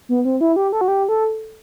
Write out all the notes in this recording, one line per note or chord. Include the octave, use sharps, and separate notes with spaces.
B3
C4
E4
G4
A4
F#4
G4
A4